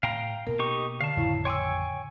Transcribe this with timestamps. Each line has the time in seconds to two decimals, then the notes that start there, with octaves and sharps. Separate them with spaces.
0.03 A2 F5 G5 A#5
0.47 B2 A#3 A#4
0.59 D#4 G4 C#6
1.01 D3 F5 A5
1.17 A1 F2 A2 C#3 E4
1.45 C#5 G5 G#5 C6 D6 E6